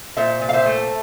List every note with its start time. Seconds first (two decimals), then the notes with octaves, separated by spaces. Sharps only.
0.17 A#2 C5 E5
0.41 A#2
0.49 F5
0.53 C5 E5
0.66 A3